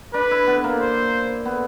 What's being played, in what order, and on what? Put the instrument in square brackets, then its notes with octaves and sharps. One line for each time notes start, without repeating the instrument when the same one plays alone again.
[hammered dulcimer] D4 [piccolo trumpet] B4
[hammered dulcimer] E4
B3
A#3
[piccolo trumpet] C5
[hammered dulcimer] B3